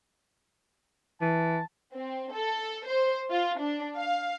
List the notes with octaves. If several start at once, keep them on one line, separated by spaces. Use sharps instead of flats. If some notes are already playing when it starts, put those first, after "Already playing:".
E3 A5
C4
A4
C5
F4
D4
F5